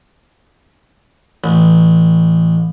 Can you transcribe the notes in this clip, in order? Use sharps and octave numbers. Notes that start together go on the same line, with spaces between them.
A1